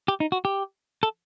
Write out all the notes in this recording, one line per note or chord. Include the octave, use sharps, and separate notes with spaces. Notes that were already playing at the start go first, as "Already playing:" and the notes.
G4
D#4
F#4
G4
A4